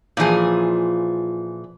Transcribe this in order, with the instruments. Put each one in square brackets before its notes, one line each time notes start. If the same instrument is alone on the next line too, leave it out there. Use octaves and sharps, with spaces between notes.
[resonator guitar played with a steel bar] A#2 E3 F3 G#4